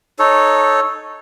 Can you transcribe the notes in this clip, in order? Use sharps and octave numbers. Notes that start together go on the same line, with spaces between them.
D#4 A4 C#5